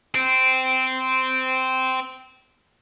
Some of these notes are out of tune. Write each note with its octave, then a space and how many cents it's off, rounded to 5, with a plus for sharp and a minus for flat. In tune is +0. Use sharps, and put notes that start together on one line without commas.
C4 -10